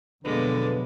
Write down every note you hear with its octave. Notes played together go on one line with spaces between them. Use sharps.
F2 B2 D3 F#3 G#3 A#3 B3 B4